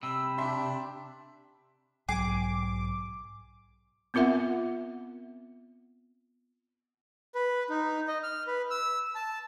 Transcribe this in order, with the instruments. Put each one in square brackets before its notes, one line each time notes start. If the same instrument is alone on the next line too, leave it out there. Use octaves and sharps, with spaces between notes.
[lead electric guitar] C3 [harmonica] G3 E6 [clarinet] B5
[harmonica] D4 G4 [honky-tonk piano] E5 C6 B6
[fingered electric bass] B1 G#2 F#3 [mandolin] G#4 [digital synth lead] D6
[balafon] B3 C4 F4 A#4 E5 F#5
[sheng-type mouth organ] B4
D#4
D#5
F6
B4
E6
A5